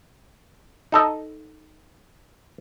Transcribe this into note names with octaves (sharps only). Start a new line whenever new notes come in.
D#4 A4 D#5